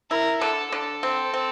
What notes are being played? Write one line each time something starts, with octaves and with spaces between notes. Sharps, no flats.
E4 A#4
D3 A4
D3 A4
C4
C4